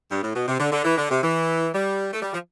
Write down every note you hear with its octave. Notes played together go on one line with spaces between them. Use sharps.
G2
A2
B2
C3
D3
D3
E3
D3
C3
E3
G3
A3
G3
F3